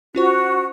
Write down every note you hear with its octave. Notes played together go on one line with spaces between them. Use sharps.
C#4 F4 F#4 C5